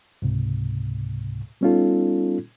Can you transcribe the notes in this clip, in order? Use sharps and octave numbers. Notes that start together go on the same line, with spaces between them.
C#2 G#2 C3
G3 B3 C#4 D#4 F4 A4